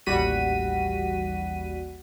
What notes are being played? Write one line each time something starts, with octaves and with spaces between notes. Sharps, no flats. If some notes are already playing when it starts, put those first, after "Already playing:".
A1 D#2 G3 F#4 B6 D#7